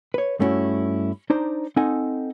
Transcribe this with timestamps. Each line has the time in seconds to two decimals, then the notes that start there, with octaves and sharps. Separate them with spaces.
0.14 B4 C#5
0.39 G2 A3 B3 C#4 E4 F#4
1.30 D4 D#4 C5 D5 A#5
1.76 C4 D#4 A4 D#5 F#5 G#5